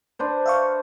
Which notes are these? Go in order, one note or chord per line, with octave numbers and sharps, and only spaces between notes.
D4 B4 C5
E5 F5 C#6